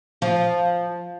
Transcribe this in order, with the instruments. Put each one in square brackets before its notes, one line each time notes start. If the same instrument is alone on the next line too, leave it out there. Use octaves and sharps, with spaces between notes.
[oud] F3